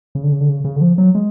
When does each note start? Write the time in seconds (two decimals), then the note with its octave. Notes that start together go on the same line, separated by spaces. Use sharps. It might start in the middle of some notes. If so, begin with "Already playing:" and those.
0.15 C#3
0.23 D3
0.32 C#3
0.41 D3
0.49 C#3
0.65 C#3
0.76 D3
0.81 F3
0.98 F#3
1.15 G#3